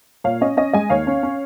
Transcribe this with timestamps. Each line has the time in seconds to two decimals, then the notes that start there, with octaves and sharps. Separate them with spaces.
0.24 A#2 C#5 F5
0.41 C#4 D#5
0.57 C#4 D#5
0.73 G#3 D#5 G#5
0.90 D#2 C#5 F5
1.07 C#4
1.23 C#4